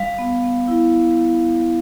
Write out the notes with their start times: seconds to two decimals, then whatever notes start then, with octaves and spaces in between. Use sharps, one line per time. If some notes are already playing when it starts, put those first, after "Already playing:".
Already playing: G3 F5
0.18 B3
0.43 B3
0.68 E4